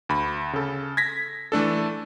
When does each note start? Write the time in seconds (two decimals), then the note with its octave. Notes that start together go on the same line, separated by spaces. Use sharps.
0.09 D2 B5
0.53 C#3 A4
0.97 G#6 A#6 B6
1.52 E3 A3 D4 A4